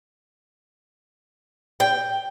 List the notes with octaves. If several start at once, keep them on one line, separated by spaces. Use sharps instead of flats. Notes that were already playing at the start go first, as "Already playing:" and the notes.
G5